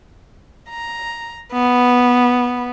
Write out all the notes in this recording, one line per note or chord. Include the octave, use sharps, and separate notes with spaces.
A#5
B3